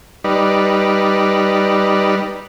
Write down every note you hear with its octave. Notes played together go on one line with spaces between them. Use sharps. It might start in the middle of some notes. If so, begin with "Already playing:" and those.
G3 D#4 B4 D5